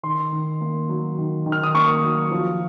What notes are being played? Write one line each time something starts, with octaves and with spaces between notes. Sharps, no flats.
D#3 C6
D#3
A#3
F#3
D#3
D#3
F6
D#6
A#3 C#6
F#3
F3